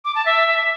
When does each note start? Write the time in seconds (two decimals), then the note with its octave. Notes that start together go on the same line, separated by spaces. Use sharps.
0.05 D6
0.15 A5
0.26 E5